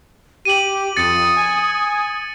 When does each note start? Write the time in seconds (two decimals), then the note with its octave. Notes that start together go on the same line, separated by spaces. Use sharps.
0.45 G4 D#7 F#7
0.97 F2 D#6 A6 C#7
1.36 G#5